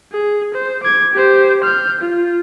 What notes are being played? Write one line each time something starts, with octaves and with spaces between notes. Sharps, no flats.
G#4
C5
D6 G#6
G4 C5
F6 G6
F4